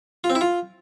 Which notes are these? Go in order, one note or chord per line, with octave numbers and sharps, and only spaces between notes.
F4
C4
E4
F4